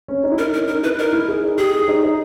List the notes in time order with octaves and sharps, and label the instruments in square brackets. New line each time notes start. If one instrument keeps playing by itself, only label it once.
[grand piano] C#4
D#4
E4
[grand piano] D#4 [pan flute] A#4
[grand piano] C#4 [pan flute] A#4
[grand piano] D#4 [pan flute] A#4
[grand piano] E4 [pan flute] B4
[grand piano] D#4 [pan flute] A#4
[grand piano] E4
G#4
D#4
[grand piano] G4 [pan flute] G#4
[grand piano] G4
D#4
D#4